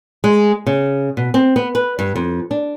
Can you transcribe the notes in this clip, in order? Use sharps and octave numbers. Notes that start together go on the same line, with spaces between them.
G#3
C#3
B2
C4
B3
B4
G2
F2
D4